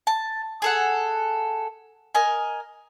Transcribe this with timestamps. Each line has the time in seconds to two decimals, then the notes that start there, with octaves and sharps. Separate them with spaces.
0.07 A5
0.62 G#4 A4 F#5
2.15 A#4 D#5 G#5